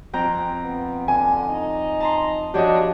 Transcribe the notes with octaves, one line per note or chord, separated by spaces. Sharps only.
F2 C4 G5 A#5
B3
D3 G#5
D#4
A5 A#5 C6
F3 D4 F#4 G4 C#5 D#5